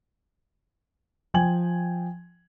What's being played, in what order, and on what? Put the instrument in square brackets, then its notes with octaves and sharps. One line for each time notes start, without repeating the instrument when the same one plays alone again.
[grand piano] F3 G5 G#5 G#6 F#7